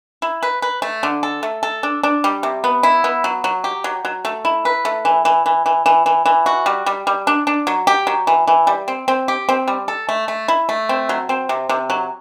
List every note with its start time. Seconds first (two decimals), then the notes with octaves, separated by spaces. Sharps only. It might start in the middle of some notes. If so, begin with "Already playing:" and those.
0.22 E4
0.43 B4
0.62 B4
0.82 A3
1.03 D3
1.23 A4
1.43 A3
1.63 A4
1.83 D4
2.03 D4
2.24 G3
2.43 C3
2.64 B3
2.83 E4
3.04 B3
3.24 F#3
3.44 F#3
3.64 G4
3.84 F#3
4.05 F#3
4.25 A3
4.45 E4
4.65 B4
4.85 A3
5.05 E3
5.25 E3
5.46 E3
5.66 E3
5.86 E3
6.06 E3
6.26 E3
6.46 F#4
6.66 G3
6.86 G3
7.07 G3
7.27 D4
7.47 D4
7.67 F#3
7.87 G4
8.07 F#3
8.27 E3
8.47 E3
8.67 G3
8.88 C4
9.08 C4
9.28 G4
9.49 C4
9.68 G3
9.88 A4
10.09 A3
10.28 A3
10.48 E4
10.69 A3
10.89 C4
11.09 F#3
11.29 C4
11.49 C3
11.69 C3
11.90 F#3